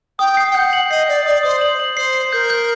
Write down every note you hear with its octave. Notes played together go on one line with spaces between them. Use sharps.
G5 D#6
C7
G5
F#5 G6
F#7
D#5 C7
D5 G6
D5 D#6
C5 D#6
F#7
F#7
C5 C7
C7
A#4 G6
G6